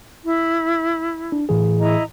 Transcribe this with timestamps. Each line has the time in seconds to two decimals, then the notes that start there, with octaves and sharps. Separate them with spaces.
0.24 E4
1.32 D4
1.49 A2 E3 G#4
1.79 E4 D#5 A#5